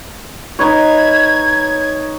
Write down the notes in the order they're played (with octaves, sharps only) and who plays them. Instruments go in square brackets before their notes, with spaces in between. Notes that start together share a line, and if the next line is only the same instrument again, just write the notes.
[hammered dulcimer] D#4 B4 C#5 [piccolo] G#6